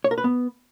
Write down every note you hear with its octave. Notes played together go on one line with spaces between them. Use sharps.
C#5
A#4
B4
B3